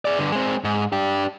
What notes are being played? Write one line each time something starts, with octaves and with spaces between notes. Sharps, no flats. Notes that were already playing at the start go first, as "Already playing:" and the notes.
G#4 D5
G2 D3
G#3 C4
G#2
D4 G4